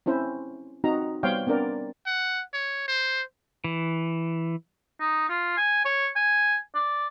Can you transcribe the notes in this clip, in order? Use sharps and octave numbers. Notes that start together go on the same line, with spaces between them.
C4 C#4 E4 C5
C4 D#4 F#4 A#5
G3 B3 C5 C#5 F5 G5
B3 C4 D4 A#4 D5
F#5
C#5
C5
E3
D#4
F4
G#5
C#5
G#5
D5